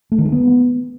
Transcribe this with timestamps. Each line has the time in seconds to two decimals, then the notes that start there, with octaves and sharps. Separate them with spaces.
0.12 A3
0.18 D#3
0.25 G#3
0.32 B3